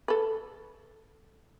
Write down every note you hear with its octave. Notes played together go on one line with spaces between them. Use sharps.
A4 B4